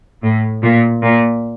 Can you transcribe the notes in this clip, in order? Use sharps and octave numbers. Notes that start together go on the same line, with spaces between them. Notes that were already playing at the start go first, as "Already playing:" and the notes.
A2
A#2
A#2